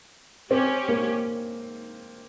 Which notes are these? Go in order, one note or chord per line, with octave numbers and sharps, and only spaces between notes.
C4 C#4 G4 C#5
A#3